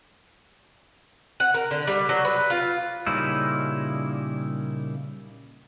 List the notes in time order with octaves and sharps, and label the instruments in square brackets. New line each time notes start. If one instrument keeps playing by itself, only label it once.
[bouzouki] F#5
A#4
D3
G3
F#3
B4
F4
[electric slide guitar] A#2 C#3 G3 C#4 D#4 E4